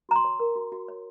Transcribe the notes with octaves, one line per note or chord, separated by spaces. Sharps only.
F#4 A#5
C6
C#5
A#4
F#4
F#4
C#5